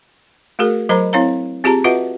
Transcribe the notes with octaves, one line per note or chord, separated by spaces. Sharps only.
A3 F#4 G#4 A#4
F#3 A#4 C5 D#5 A#5 B5
C4 E4 C#5 F5 A#5
C4 F4 G4 G#4 A5 A#5
F4 F#4 B4 D#5 E5 F#5